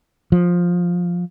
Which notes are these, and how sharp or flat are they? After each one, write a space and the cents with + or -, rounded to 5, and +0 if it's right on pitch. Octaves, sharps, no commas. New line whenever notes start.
F3 +10